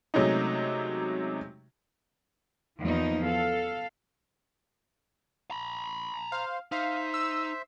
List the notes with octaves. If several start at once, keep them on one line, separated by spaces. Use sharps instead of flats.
C3 F#3 G#3 A3 C#4 D#4
E2 F3 A#3 D#4
A4 F5
A#5 B5
C5 F5
D#4 C5 E5 F5
E6